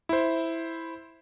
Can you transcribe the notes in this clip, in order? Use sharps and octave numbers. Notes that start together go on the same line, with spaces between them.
E4 C5